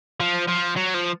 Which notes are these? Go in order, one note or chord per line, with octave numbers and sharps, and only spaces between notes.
F3
F3
F#3
F3